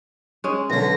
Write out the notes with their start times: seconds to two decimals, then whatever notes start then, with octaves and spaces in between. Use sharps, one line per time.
0.44 G#3 C#4
0.70 B1 D3 A#6